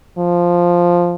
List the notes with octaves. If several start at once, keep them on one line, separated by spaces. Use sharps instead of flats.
F3